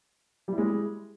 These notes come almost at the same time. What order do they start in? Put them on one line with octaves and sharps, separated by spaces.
G3 E4 G#3